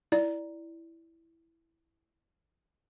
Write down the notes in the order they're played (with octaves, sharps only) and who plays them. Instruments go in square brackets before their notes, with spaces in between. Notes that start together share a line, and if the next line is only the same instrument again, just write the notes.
[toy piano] E4 [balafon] D5